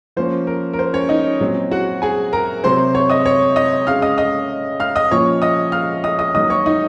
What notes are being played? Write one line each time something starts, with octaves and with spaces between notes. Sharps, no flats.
F3 A#3 C#4 C5
A#4
A#4
C5
C#4 C#5
D#4 D#5
A#2 F#3 C4
F#4 F#5
G#4 G#5
A#4 A#5
C3 F#3 C4 C5 C6
C#5 C#6
D#5 D#6
C#5 C#6
D#5 D#6
C#3 G#3 C#4 F5 F6
D#5 D#6
D#5 D#6
F5 F6
D#5 D#6
A#2 F3 A#3 C#4 C#5 C#6
D#5 D#6
F5 F6
D#5 D#6
D#5 D#6
D#3 F#3 A#3 D#5 D#6
C#5 C#6
D#4 D#5